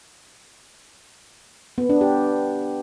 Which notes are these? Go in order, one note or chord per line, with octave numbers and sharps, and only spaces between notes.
B3
D4
G4